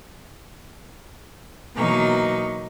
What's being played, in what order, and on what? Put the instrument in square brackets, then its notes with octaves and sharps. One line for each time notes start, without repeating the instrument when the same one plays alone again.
[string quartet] B2 E3 F#3 A#3 D#4 C#6